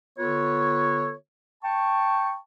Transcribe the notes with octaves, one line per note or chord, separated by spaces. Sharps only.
D3 B3 F4 A4 B4 C#5
G5 A5 C#6